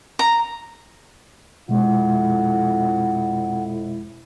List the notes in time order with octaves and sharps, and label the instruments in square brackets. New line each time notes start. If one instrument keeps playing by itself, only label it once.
[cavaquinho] A#5
[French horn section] F2 E4 [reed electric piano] B2 G#3 [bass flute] F#5